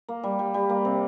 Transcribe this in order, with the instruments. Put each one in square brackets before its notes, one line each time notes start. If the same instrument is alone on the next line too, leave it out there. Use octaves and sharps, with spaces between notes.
[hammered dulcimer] A#3
G3
G3
G3
A#3
C3